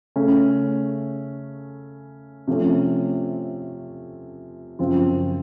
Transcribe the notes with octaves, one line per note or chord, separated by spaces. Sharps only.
C#3 A3 C#4
C3 F3 A3 C#4
F#2 C#3 F3 C4 F4